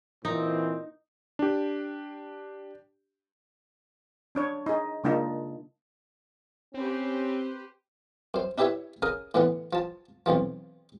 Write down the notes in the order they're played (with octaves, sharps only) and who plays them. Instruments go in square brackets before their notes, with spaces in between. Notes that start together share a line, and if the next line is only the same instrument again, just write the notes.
[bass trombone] A#2 [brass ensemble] E3 C4 [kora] D#4
[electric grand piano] D4 G4
[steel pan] C#4 D4 C#5
D#4 G#4
C#3 G#3 A#3 D4 D#4 F4
[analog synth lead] C4 [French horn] C#4 [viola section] G4 B4 C5
[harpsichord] F#2 C5
D4 E4 G4 B4 C#5 E5
C#3 A#4 D#6
A2 D3 E3 B3 F#5
F3 A5
B1 F2 E3 F3